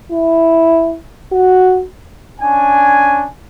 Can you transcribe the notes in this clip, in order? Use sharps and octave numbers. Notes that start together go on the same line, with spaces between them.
E4
F#4
C#4 D4 G#5